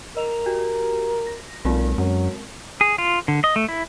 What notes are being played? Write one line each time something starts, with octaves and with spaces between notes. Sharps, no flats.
A#4 D#5 F7
F#4 G4
A#6
B1 A#2 G#3 C4 A#4
F#2 F#3
G#4
F4
D3
D#5
A3
E4